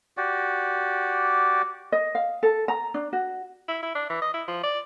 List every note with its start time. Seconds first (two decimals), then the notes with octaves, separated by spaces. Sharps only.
0.17 F#4 G4 D5
1.92 D#5
2.15 F5
2.43 A4
2.68 A#5
2.94 D4
3.13 F#4
3.69 E4
3.83 E4
3.95 D4
4.10 E3
4.22 D#5
4.34 E4
4.48 F3
4.63 D5